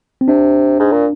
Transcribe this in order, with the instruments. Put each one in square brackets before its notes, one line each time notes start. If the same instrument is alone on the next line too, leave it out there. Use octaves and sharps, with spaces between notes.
[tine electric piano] C4
[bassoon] C3 [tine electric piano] D4
[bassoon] G#2
A#2